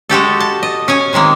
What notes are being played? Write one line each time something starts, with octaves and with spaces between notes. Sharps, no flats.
G#3 F#4 G4 A4
A5
D#5
C#4 C#5 G#5
C3 D#3 G#3 A#3